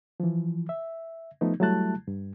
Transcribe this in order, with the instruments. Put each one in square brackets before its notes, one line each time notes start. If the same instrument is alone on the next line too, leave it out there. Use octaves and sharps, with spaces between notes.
[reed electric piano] E3 F3
E5
F3 A3 B3 D#4
F#3 G3 A3 E4 A5 F#6
G2